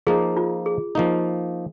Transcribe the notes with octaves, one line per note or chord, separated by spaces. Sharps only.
F3 A#3 D#4 G#4
F4
G#4
F3 A#3 D#4